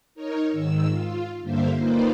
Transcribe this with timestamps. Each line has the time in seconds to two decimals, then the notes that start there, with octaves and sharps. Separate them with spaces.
0.15 D#4 A#4 C#5
0.51 G#2 D#3 E6
0.88 F4
1.41 G2 D3 A#3 C5 E5 F5
1.77 A#3 D#4 F4 B4 C5 D5